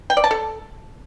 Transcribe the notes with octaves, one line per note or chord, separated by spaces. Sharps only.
G5
D5
A5
A4